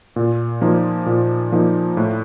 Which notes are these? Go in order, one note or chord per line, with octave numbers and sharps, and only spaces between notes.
A#2
F3 A#3 D#4
A#2
F3 A#3 D#4
A2